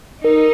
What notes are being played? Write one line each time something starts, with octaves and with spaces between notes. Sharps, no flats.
D#4 A#4